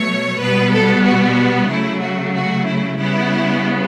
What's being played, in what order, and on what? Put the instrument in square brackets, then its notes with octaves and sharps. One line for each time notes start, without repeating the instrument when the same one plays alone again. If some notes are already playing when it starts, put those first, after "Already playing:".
Already playing: [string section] B2 F#3 A3 C#5
B2 G3 B3 B4
A4
F#4
C#3 F#3 A3 E4
F#4
F#4
E4
C#3 G3 B3 E4